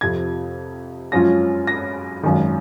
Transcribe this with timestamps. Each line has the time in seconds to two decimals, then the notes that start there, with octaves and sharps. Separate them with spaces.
0.01 F2 C3 F3 G#6
1.12 F#2 F3 G#3 C#4 F4 A#6
1.67 A#6
2.23 G#1 F#2 D#3